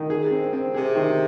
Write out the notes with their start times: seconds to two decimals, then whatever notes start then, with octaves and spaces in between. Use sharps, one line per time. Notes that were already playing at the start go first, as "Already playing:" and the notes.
Already playing: D#3
0.10 G#4
0.31 C4
0.53 C4
0.74 C3 G#4
0.96 D#3